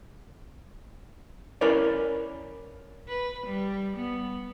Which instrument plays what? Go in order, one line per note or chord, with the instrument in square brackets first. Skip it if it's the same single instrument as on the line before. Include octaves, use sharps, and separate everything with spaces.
[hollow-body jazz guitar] C#4 E4 A#4 B4 C#5 D5
[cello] B4
G3
B3